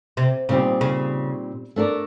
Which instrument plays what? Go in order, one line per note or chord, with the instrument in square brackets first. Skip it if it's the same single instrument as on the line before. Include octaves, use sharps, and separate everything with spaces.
[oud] C3
[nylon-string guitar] A#2 G3 C4 D#4 G4 [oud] C#3
[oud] C#3
[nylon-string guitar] A3 D4 F#4 A#4 D5